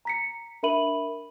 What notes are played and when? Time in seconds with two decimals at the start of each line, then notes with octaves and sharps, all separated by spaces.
0.05 A#5 B6 C#7
0.63 D4 A#4 E5 B5 D#7 F#7